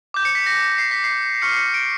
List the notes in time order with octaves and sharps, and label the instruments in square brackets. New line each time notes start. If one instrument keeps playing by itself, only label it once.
[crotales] D6 G6
C#7
B6
A#6
C7
B6
C7
C#6 F6 C#7
C7
C#7
D7